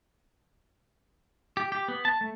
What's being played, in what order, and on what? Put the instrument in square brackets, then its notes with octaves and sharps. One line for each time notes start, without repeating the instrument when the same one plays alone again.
[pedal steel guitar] G4
G4
B3
A5
A3